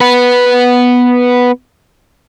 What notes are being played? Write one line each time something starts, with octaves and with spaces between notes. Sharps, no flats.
B3 B4